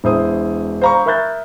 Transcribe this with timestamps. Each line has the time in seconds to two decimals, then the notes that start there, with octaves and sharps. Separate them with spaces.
0.04 E1 E4 C5 D#6
0.82 C5 F5 A#5 B5 C#6
1.06 A#4 E5 B5 F#6 G6 A6